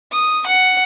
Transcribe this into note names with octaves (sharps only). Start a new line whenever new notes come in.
D#6
F#5